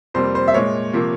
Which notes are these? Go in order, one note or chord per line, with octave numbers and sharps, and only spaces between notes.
F2 C3 G3 A#3 C5
C5
E5
A#2 G#3 C#5
C3 F3 A#3